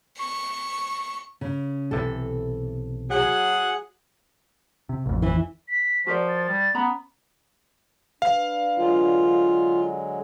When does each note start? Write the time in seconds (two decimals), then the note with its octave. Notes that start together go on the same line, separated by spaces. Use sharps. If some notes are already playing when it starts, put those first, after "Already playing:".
0.18 C#6
1.41 C#3
1.91 B1 C3 E3 A4
3.10 F#3 G#4 F#5
4.89 C3
5.06 A1 F2
5.22 E3
5.68 B6
6.07 F3 F#4 A#4 D5
6.29 A6
6.48 G3
6.75 B3 C#4 A#5 B5
8.22 D4 B4 F5
8.78 D3 F#3 G#3 F4